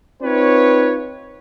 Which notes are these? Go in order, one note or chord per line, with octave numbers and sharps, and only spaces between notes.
C4 D#4 F4 B4 C#5